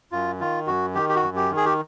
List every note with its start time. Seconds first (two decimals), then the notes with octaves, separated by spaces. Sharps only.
0.12 F#2 F4
0.40 D#3 F4
0.67 F#2 F#4
0.95 D#3 G4
1.09 G4
1.16 F#4
1.23 F#2
1.36 G4
1.51 D#3
1.57 G#4
1.65 G4